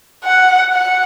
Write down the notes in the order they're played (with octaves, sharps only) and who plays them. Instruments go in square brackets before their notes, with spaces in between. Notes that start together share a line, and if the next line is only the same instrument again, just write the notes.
[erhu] F#5
F#5